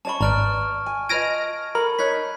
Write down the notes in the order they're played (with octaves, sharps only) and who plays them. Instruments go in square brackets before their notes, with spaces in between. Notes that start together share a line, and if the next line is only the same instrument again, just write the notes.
[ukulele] C#4 D5 B5 [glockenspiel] A5 C#6
[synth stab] G#1 [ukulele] B4 D5 A#5 [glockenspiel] A5 F6 D7
[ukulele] G#5
[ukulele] F4 B4 D#5 [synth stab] F6 A#6 D7 [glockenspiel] G#6 D#7
[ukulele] A4 [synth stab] A#4 [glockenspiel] B5
[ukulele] D#4 C#5 [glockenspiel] F#6 G#6 B6